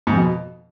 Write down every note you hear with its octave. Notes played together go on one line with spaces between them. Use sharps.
G#2
F2
B2